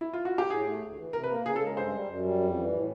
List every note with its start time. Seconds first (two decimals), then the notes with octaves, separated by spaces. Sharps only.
0.01 E4
0.13 F4
0.25 F#4
0.38 G4
0.50 A2 G#4
0.66 A3
0.82 D2
0.98 E3
1.13 C3 A#4
1.24 B4
1.29 A#3 A#4
1.45 C#3 G#4
1.56 A4
1.61 G#3
1.67 A#4
1.77 G2 C5
1.93 G3
2.08 F#2
2.25 G3
2.41 F2
2.56 E3
2.72 A2